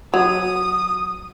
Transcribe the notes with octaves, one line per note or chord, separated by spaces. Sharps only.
F#3 D#6